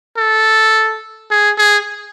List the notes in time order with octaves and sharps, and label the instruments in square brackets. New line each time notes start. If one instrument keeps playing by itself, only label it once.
[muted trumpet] A4
G#4
G#4